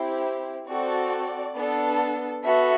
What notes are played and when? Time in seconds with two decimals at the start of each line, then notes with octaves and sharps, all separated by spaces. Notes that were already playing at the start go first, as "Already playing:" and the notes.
Already playing: C4 E4 G4 C5
0.69 C4 F#4 A4 D5
1.56 B3 D4 A4
2.43 B3 F#4 A4 E5